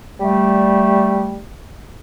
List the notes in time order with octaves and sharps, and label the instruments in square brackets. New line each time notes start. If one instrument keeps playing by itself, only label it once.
[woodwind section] G3 A3